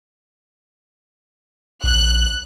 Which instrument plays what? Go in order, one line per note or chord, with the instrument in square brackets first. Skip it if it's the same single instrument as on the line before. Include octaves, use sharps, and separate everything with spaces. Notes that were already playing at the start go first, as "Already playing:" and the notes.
[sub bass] A#1 [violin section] F#6